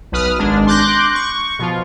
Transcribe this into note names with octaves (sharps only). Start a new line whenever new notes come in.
B1 B4 D#6 F6
G#1 G#3 D4
C6 D6 F#6 G6 A#6
C#6
B2 F3 F4